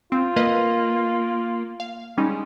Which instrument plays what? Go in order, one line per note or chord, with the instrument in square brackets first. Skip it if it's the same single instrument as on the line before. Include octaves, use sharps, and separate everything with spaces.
[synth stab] C4 [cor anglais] F4
[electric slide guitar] A#3 [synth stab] B4 D#5
[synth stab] F5
[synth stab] G3 C#4 D#4 [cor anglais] G#3